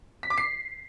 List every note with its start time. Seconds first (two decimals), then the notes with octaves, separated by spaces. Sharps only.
0.23 B6
0.30 D6
0.38 C7